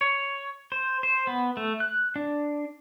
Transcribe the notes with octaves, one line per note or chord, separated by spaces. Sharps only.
C#5
C5
C5
B3
A3
F#6
D4